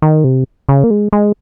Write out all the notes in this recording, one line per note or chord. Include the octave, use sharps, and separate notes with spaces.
D#3
C3
C#3
A#3
G#3
G#3